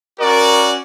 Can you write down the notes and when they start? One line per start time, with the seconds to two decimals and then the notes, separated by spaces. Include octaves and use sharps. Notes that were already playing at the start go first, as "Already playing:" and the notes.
0.20 C#4 F#4 A#4 D5